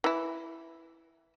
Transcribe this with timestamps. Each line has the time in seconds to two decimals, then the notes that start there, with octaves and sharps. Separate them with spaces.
0.04 E3 E4